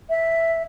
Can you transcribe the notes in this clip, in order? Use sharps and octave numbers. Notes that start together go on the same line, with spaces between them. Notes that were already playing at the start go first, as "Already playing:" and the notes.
E5